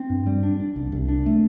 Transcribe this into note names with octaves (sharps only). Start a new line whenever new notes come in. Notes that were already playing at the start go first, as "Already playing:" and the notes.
Already playing: C4
G2
G3
D4
D4
C2
C2
D4
A3